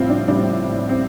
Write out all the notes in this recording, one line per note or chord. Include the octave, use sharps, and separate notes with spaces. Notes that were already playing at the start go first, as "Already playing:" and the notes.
Already playing: A2 F3 G3 C4 F4
D4
A2 G3 D4
C4